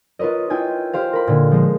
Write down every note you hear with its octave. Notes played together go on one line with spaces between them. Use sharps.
F4 A#4 B4 C#5 D#5
E4 F4 G5 G#5
G4 C5 F5
A#4 B5
A#2 D3
F3 G#3